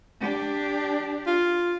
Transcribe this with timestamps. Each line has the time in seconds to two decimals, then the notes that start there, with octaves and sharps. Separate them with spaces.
0.21 D4 G4
1.27 F4